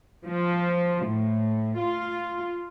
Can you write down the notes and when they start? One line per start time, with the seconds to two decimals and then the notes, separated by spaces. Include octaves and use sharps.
0.24 F3
1.06 A2
1.79 F4